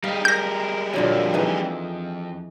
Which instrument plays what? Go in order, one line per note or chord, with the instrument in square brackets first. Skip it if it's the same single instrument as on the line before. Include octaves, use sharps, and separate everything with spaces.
[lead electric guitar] G3 G#3 [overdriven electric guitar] D#4 [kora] F5
[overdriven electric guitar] A#4 [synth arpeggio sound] G6 A#6
[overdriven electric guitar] F2 [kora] A#2 D3 F#3
[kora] E3 D#4 G#4